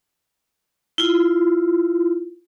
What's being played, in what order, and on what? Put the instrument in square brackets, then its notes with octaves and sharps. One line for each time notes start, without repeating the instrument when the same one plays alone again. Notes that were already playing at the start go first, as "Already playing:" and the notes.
[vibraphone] E4 F4